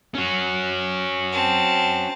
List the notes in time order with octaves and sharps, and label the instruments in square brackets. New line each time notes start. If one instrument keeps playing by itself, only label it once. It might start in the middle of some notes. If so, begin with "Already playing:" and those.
[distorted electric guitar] C#4 F#4
[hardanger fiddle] C4 A5